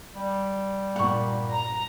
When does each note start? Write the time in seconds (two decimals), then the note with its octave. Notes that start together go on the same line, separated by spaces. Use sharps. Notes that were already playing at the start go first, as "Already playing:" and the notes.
0.14 G3
0.96 G2 A#2 F#5 C#6
1.51 A#5